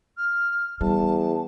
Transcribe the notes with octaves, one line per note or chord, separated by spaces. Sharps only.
F6
E2 G3 A5